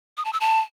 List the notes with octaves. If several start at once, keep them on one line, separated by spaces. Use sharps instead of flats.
D#6
A5
E6
A5